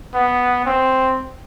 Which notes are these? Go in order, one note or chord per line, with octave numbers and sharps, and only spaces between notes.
B3
C4